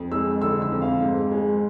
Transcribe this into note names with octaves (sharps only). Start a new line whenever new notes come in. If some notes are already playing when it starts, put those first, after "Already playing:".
Already playing: F2
G#3 E6
D3 E6
E6
F2
F5
G#2
G#3